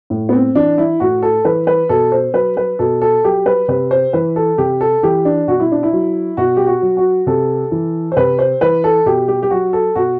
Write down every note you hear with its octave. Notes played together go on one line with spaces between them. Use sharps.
A2
B3
C4
E3 D4
E4
A2 F#4
A4
E3 B4
B4
B2 A4
C5
F#3 B4
B4
B2 A4
A4
F#3 G4
B4
C3 B4
C5
E3 B4
A4
C3 G4
A4
E3 G4
D4
B2 F#4
E4
D4
E4
F#3
B2 F#4
G4
F#4
F#3
F#4
C3 A4
E3
C5
C3 B4
C5
E3 B4
A4
B2 G4
G4
G4
F#3 F#4
A4
B2 F#4